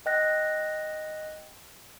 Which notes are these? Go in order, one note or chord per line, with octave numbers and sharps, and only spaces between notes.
D#5 G5 F#6 A#6